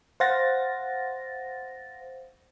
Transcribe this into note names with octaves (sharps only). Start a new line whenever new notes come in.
C5 F5 F#5 A6 A#6